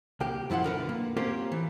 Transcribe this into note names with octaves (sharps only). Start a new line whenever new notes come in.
C2 A#3 G4
F#2 F3 E4 F4 F#5
B1 D3 A#4 B4
A#3
A#3 C4 C#4 F4 G4 A#4
E3